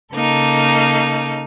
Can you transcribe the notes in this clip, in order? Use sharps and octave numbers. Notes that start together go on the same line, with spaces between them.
C#3 A#3 D#4 A4